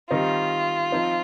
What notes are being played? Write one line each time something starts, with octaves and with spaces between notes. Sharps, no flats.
D#3 G3 C4 D#4 F4
F3 C4 D#4